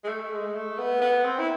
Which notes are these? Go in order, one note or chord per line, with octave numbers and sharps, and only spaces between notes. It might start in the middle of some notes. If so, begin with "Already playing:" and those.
G#3
A3
G#3
A3
B3
B3
C4
E4